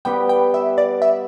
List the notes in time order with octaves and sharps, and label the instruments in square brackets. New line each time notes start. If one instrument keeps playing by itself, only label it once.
[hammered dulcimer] G3 B3 G4 B4 [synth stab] G5
[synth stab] G5
E5
D5
E5